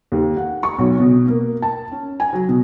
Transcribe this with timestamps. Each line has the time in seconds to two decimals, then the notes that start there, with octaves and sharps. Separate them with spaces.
0.12 D#2
0.37 F#5
0.63 C#6
0.79 B1
1.00 B2
1.28 A#3
1.62 A5
1.92 C#4
2.20 G#5
2.33 F#3
2.49 B2